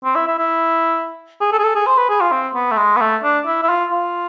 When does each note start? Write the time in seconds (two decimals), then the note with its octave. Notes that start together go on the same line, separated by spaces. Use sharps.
0.04 C4
0.15 E4
0.27 E4
0.38 E4
1.41 G#4
1.52 A4
1.59 G#4
1.64 A4
1.75 G#4
1.86 C5
1.97 B4
2.09 G#4
2.21 F4
2.32 C4
2.54 B3
2.71 A3
2.78 G#3
2.96 B3
3.00 A3
3.23 D4
3.46 E4
3.63 E4
3.69 F4
3.92 F4